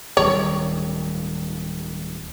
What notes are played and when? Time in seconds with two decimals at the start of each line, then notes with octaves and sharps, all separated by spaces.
0.17 D1 D#3 G3 C#5